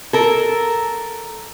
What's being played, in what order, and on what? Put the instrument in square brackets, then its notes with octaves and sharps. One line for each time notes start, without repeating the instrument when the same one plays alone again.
[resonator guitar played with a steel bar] A4 A#4